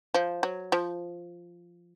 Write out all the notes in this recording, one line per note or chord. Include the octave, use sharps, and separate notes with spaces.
F3
F#3
F3